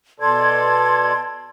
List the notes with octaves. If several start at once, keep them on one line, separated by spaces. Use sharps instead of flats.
B2 A4 D5 C6 G#6